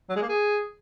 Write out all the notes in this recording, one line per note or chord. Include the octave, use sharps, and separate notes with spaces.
F#3
G#3
A#3
G#4